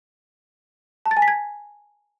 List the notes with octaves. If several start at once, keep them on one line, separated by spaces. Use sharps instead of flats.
A5
A6
G#5
B6
G#6